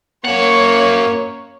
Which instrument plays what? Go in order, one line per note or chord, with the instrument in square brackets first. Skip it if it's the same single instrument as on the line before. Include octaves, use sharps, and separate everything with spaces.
[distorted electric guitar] F#2 F#5 [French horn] A#3 [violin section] C#5